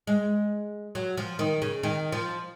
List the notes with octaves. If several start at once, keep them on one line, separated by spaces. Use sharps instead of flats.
G#3
F#3
F3
D#3
C#3
D#3
F3